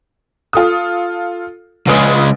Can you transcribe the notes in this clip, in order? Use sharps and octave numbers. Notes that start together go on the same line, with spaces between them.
F4 A4 D#6
A#1 C#3 G#3 B4 D#6